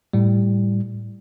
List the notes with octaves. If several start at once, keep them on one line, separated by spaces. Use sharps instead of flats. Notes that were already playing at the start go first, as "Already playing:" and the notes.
A2 G3